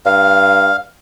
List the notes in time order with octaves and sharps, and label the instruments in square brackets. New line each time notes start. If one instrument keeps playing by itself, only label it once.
[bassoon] G2 [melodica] F5